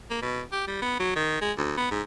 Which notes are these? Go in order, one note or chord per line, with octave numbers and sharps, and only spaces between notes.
A#3
B2
G4
G3
B3
F#3
D#3
G#3
D2
B3
G#2